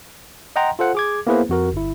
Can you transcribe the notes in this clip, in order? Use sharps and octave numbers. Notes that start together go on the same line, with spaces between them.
D#5 F#5 G5 A#5 C6
F4 A4 C5 F#5
G#4 D6 G#6
A#3 B3 E4 G#4 B4 C5
F2 F#4 A#4
G1 E4